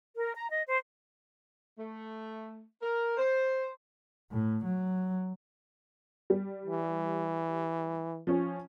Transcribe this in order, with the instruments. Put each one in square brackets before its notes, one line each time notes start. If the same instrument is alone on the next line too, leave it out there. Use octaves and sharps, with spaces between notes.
[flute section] A#4
A#5
D#5
C5
[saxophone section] A3
A#4
C5
[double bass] A2
F#3
[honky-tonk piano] G3
[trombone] E3
[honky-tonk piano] F3 C#4